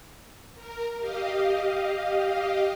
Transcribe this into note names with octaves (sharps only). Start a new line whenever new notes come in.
A#4
G4 D#5 F5